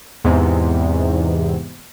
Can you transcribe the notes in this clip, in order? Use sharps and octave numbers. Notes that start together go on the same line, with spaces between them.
E2 G#2 C3